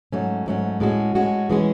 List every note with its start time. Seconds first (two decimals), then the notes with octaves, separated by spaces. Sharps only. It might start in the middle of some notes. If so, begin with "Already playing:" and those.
0.12 G#2 F#3 A3 C#4
0.46 G#2 F#3 A3 C#4
0.80 A2 G#3 C#4 F#4
1.15 A2 G#3 C#4 F#4
1.49 E3 G#3 C#4 G#4